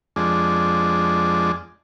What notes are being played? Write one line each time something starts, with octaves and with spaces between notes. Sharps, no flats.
F2 G#3 D4